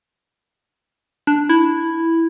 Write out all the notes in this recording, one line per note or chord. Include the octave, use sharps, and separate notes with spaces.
D4
E4